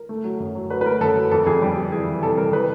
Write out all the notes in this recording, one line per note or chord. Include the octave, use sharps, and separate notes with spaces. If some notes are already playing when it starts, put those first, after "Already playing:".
Already playing: A#4
A3
F#3
F#2
F#3
F#3 B4
B4
A3 A#4
F#2 A4
F#3
F2 A4
F2 G#4
G3 G4
G3
E3 G#4
E3
C3 A4
G3 A#4
E3 B4